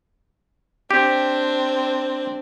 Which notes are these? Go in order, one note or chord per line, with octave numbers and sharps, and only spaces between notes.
C4 D4 G4